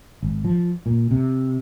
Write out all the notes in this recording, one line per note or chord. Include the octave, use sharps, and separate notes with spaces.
G#1
F3
A#2
C3